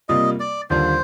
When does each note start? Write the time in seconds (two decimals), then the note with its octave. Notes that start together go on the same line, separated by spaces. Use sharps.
0.09 C3 G3 A#3 F4 D#5
0.40 D5
0.70 D#2 D3 G3 D4 F4 C5